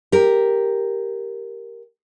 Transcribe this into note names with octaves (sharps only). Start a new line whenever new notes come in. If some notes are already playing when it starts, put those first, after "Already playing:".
G4 A#4